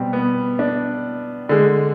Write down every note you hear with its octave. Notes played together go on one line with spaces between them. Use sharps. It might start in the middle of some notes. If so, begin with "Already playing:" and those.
Already playing: B2 G3 C4
B3
D4
D3 G#3